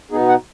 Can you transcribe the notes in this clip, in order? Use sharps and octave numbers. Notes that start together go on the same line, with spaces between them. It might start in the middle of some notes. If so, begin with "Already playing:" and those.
B2 B3 D#4 G#4
F#5